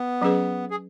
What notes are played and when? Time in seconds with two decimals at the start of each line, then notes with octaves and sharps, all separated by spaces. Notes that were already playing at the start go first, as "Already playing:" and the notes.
Already playing: B3
0.22 F#3 C#4 G#4 B4
0.71 G#4